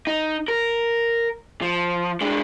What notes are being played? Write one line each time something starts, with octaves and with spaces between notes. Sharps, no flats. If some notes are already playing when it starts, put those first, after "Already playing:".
D#4
A#4
F3
G#3 D4